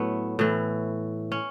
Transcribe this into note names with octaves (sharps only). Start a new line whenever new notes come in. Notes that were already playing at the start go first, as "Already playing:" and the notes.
Already playing: A2 F#3 A3 B3
A2 E3
C#4